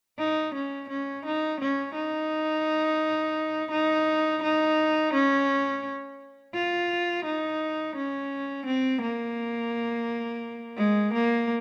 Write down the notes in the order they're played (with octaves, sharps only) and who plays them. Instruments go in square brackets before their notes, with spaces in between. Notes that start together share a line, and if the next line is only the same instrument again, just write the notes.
[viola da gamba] D#4
C#4
C#4
D#4
C#4
D#4
D#4
D#4
C#4
F4
D#4
C#4
C4
A#3
G#3
A#3